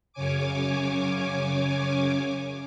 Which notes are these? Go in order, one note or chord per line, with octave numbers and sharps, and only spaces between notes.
F#2 C#3 C#5 G#5 D6